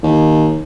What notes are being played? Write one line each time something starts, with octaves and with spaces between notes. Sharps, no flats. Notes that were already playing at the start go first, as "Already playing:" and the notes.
D#2